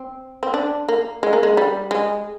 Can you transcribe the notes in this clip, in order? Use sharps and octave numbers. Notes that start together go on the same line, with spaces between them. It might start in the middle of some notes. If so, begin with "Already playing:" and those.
Already playing: C4
C4
D4
A#3
G#3
A#3
G#3
G3
G#3